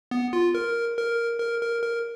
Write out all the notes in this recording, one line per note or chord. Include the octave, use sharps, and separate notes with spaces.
B3
F4
A#4
A#4
A#4
A#4
A#4